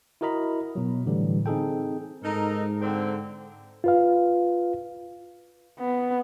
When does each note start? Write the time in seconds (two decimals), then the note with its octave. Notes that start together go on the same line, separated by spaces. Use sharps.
0.21 E4 F#4 A#4 D#5 A#5 B5
0.75 B2 F#3
1.06 A2 D3 E3 G3
1.46 C4 D#4 G#4 A4 G5
2.24 G#2 D#4 A4 A#4
2.82 D3 C4
3.84 F4 B4 F5
5.79 B3